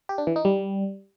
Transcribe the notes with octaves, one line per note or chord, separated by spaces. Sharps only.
G4
D4
E3
D#4
G3